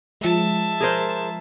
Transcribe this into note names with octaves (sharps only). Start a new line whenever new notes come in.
F3 G#3 E5 A5
G#4 A#4 C5